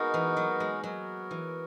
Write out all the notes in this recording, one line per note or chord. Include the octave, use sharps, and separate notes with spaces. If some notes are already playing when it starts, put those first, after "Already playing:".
Already playing: G#3 A#3 B3 D#4 F#4 A#4
E3
F#3
G#3
F#3 B3 F#4 A#4
E3